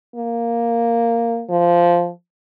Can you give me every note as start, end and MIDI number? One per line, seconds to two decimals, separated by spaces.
0.15 1.43 58
1.49 2.10 53